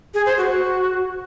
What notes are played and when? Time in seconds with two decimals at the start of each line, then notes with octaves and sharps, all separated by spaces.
0.14 G#4
0.26 C5
0.38 F#4